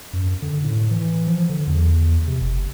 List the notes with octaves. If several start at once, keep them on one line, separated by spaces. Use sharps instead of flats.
F#2
D3
A2
E3
F3
D3
E2
C3
F#1